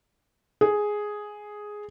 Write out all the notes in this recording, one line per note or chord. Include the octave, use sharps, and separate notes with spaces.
G#4